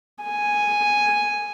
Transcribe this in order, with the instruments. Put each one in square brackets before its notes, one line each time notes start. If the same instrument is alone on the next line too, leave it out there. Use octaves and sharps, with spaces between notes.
[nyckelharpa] G#5